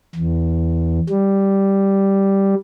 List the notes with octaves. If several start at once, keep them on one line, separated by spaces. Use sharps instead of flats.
E2
G3